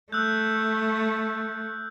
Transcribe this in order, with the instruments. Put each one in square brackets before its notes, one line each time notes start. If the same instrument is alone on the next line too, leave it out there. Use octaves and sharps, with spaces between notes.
[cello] A3 [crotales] E6 F#6 G6